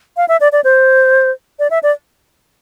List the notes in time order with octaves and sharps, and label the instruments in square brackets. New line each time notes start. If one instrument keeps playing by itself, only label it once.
[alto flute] F5
E5
D5
D5
C5
D5
E5
D5